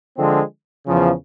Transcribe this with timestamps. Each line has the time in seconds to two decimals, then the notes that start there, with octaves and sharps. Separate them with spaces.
0.17 D3 F3 G#3 C4
0.87 E2 C#3 F3